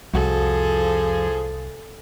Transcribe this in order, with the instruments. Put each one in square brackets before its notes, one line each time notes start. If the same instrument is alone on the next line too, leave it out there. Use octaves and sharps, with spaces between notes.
[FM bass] C2 [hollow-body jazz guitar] F2 F#4 [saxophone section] F3 G#4 [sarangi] A4